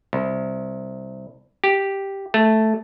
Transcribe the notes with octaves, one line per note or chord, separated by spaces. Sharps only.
C2
G4
A3